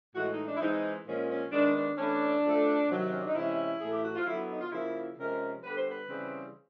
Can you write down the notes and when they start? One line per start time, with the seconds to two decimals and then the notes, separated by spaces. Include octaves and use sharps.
0.15 A2 E3 G#3 F#4
0.31 D#4
0.46 D4
0.57 E4
0.60 E3 G#3 C4 D#4
1.06 A#2 F3 G#3 C#4
1.29 C#4
1.52 D#3 G#3 B3 D4
1.75 D4
1.98 E3 A3 C#4 D4
2.43 D3 F3 A3
2.89 C3 D#3 F#3
3.10 C#4
3.18 D4
3.27 D#4
3.35 C3 E3 G#3 C#4 E4
3.80 A2 E3 A3 G#4
3.92 G4
4.03 F#4
4.15 F4
4.26 D3 F#3 B3 E4
4.49 D#4
4.61 F4
4.72 C#3 F3 A#3 E4
5.18 C3 F3 G#3 C#4 A#4
5.63 D3 G3 B3 B4
5.76 C5
5.89 B4
6.09 C#3 E3 G3 C4